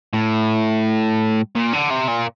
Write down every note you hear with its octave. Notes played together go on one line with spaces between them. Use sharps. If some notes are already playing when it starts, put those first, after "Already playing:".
A2
A#2
D3
C3
A#2